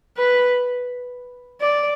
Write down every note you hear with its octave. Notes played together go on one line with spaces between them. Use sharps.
B4
D5